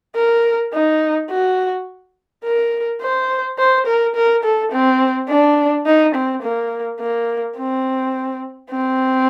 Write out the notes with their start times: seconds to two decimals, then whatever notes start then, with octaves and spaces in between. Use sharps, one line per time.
0.15 A#4
0.73 D#4
1.30 F#4
2.44 A#4
3.01 C5
3.59 C5
3.87 A#4
4.16 A#4
4.44 A4
4.72 C4
5.29 D4
5.86 D#4
6.15 C4
6.43 A#3
7.00 A#3
7.57 C4
8.71 C4